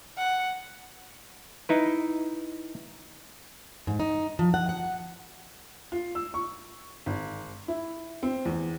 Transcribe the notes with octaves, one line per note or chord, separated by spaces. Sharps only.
F#5
D#4 E4 B4
G#2
D#4
F3
F#5
F#5
F4
E6
C#6
G#1
E4
C4
E2